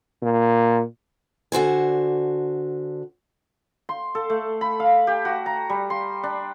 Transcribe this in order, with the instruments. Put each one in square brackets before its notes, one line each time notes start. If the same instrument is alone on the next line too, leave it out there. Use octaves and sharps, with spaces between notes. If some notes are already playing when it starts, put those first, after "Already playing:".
[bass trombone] A#2
[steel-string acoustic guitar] D3 F#4 C5 G#5
[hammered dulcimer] C6
A4
A3
B5
F5
G4
F#4
A#5
G3
C6
D4